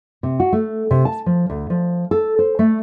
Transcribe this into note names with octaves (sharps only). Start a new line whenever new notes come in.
C3
F#4
A3
C3
A5
F3
D2
F3
A4
C5
A3